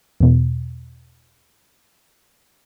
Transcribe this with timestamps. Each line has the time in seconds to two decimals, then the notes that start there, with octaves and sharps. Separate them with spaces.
0.20 E2 B2